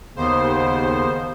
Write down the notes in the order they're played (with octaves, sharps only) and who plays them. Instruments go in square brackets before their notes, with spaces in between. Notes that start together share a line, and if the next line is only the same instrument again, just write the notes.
[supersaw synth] D#2 C5 [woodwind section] C#3 A#3 B3